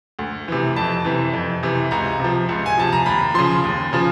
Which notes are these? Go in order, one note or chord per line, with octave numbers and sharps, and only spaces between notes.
D2
C3 E3
F2 A5
C3 E3
F2
C3 E3
C#2 A#5
C3 F3
C#2
G#5
C3 F3 A5
A#5
D#2 B5
C#3 F3 C6
D#2
C#3 F3